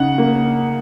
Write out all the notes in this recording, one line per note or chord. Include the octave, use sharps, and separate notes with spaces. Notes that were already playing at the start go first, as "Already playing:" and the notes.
Already playing: C#3 C#4 D#4 F#5
A#3